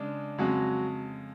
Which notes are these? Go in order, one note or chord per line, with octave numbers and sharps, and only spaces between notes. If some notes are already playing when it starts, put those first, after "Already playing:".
Already playing: C#3 G#3 D4
F2 C#3 F#3 G#3 F#4